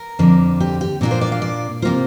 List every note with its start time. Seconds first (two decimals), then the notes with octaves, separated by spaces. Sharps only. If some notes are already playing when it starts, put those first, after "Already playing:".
Already playing: A#4
0.19 F2 D3 A#3
0.60 G4
0.81 G4
1.01 A#2 A#3 D4 F4 A#4
1.11 C5
1.21 D5
1.32 F5
1.42 D5
1.82 C3 A#3 F4 C5